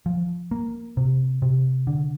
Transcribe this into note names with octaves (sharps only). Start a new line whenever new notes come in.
F3
A#3
C3
C3
D3